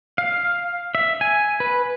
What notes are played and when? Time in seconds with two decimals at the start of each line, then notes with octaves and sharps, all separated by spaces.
0.18 F5
0.95 E5
1.21 G#5
1.60 B4